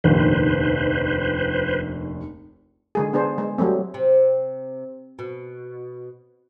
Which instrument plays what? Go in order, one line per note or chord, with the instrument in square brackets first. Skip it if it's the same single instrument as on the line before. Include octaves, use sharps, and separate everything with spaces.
[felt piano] F1 A#1 D#2 [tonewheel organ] B4 C5
[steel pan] D3 G#3 G#4
B3 D4 G#4 C5
G#3
F#3 G3 A3 C4
[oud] C3
B2